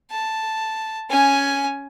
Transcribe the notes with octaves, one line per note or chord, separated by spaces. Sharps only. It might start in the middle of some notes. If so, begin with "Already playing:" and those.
A5
C#4 G#5